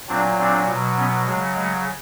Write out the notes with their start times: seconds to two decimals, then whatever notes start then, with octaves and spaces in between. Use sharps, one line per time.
0.08 A#2 F#3 C4 D4
0.38 C4 D4
0.68 B2 F#3
0.97 B3 C#4
1.26 C#3 F#3 G#3
1.56 G#3